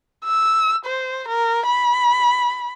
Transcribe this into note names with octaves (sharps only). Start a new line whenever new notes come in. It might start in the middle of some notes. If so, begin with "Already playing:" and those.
E6
C5
A#4
B5